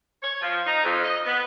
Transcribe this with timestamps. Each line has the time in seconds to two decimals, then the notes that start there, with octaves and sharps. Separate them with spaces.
0.22 C#5
0.42 F3
0.66 D#4
0.84 F2
1.04 D#5
1.25 B3